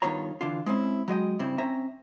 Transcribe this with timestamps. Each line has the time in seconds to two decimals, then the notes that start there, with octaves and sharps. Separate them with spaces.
0.02 G2 D#3 B3 F4 C#5 A#5
0.41 D3 E3 D4 F4
0.66 G#3 C4 C#4 E4
1.08 F#3 G#3 D#5 G5
1.39 G2 C#3 C4 E4
1.58 C4 C#4 E5 A#5